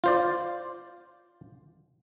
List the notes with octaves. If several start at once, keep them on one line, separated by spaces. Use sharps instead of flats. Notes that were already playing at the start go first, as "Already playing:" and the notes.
F4 C5 D5